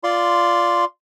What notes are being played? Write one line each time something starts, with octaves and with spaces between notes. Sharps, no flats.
F4 D5 C6